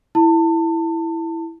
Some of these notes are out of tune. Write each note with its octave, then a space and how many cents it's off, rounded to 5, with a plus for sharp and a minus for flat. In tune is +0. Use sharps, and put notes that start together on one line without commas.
E4 +0 A5 +30